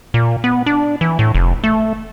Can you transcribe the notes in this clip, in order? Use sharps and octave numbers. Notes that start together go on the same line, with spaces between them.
A#2
B3
D4
E3
A2
F1
A3